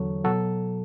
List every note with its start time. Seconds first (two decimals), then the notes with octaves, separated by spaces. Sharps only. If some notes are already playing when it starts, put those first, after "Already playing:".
Already playing: E2 D3 F#3 A4 C#5
0.24 B2 F#3 F#4 A4